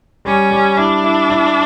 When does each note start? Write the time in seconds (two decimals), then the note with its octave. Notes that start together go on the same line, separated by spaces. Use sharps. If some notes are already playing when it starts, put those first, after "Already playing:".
0.25 G3 C#4
0.51 G3
0.77 D4 E4
1.04 E4
1.30 E4